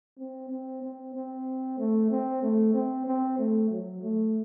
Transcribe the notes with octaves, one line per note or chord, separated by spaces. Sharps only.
C4
C4
C4
C4
A3
C4
A3
C4
C4
A3
F#3
A3